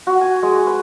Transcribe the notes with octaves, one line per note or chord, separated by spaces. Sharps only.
F#4
G#5
G#3
B4